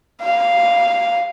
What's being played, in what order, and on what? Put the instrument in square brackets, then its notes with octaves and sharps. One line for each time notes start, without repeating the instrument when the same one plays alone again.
[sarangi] F5